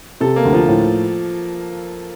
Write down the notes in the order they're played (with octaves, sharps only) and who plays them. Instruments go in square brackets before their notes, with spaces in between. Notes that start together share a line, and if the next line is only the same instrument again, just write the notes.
[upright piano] C3 [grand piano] A4
[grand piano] A#3
[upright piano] D2
[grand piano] F3
[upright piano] A2